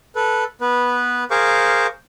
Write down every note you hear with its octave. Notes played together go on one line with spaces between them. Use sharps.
A4 B4
B3 B4
G#4 A#4 C5 F5 C#6 D6